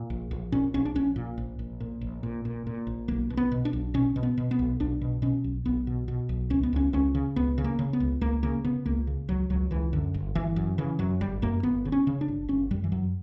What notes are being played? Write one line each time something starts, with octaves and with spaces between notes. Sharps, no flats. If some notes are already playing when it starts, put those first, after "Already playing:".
Already playing: A#2
A#1
A#1
A#2 C#4
A#1 C#4
D4
A#1 C#4
A#2
A#1
A#1
A#2
A#1
A#2
A#2
A#2
A#1
B1 A#3
B2
B3
B2
D4
B1
B2 C#4
B2
B3
B2
B3
B1
B1 D4
B2
B2 C#4
B1
B1 B3
B2
B2
B1
C#2 C#4
B3
C#2 C#4
C#2 C#4
C#3
C#2 B3
C#3
A#3
C#3
B3
C#2
C#2 A#3
C#3 A#3
C#3 B3
C#2 A#3
C#3
C#2 F#3
C#2 F#3
C#2 E3
F#2 D3
G1
G1 E3
F#2
C#3 E3
F#2 F#3
G1 G3
F#2 A#3
G1 B3
C#3
C#4
C#3
D4
G1
G1 C#4
F#2 G3
E3
F#2 F#3